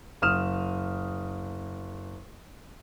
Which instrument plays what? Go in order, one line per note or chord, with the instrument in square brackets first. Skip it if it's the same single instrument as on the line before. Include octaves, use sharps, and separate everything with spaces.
[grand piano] F#1 D#6 F6 E7